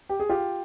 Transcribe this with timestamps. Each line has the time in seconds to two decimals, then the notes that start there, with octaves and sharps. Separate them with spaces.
0.09 G4
0.20 G#4
0.29 F4 G4